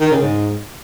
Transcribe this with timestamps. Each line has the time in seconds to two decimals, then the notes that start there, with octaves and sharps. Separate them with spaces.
0.01 D#3
0.11 C#3
0.22 G#2